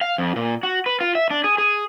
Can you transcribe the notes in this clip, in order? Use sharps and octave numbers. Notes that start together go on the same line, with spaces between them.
F5
F2
A#2
F#4
B4
F4
E5
D4
G#4
G#4